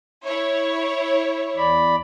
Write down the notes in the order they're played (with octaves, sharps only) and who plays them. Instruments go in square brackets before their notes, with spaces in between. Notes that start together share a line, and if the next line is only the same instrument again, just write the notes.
[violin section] E4 C#5
[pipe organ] E2 D5 B5